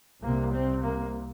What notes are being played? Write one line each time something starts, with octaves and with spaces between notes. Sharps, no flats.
C2 C3 A#3
C4
A#3